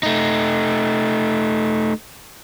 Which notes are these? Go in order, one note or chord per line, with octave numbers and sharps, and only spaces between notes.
A3 D#4